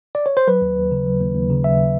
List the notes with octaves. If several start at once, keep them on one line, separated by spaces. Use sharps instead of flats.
D5
C#5
C5
F#3 B4
D#2
D#2
C#3
F#3
D#2
D#2
C#3
F#3 E5